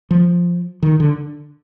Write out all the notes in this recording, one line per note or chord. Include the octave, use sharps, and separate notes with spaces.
F3
D#3
D3